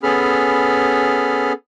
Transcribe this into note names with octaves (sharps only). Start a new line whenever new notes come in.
B3 C#4 G#4 A4 B5 F6